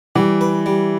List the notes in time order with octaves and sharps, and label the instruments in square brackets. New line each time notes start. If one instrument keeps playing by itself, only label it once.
[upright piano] E3 [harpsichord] G3
[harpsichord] B4
G3